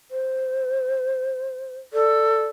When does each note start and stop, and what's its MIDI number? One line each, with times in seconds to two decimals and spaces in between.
0.11 1.77 72
1.93 2.44 69
1.93 2.49 74